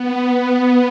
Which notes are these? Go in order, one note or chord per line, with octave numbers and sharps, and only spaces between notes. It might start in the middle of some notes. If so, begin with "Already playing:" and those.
Already playing: B3
B3